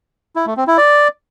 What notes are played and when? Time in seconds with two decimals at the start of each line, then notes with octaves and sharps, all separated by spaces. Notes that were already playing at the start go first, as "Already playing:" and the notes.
0.36 E4
0.46 A3
0.57 C4
0.67 E4
0.78 D5